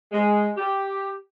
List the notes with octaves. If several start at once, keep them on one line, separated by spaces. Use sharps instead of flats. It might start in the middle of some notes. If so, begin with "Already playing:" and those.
G#3
G4